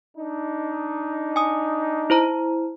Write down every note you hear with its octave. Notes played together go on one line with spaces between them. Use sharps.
D4 D#4
G#5 D#6
E4 C5 A#5